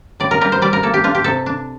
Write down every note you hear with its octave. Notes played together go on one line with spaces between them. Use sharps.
A2 D5
A#4
G3 A#4
C5
G3 D5
A#4
A#3 A4
G4
D4 F4
G4
C3 A4
D4